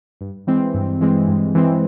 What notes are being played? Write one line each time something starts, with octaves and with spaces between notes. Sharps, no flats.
G2
E3 G#3 C4
G2
E3 G#3 C4
G2
E3 G#3 C4